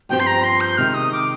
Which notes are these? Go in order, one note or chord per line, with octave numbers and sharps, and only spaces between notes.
G2 F3 C4 G4 G5
C6
A#5
C6
G6
C3 D#3 G#3 F6
D#6
D6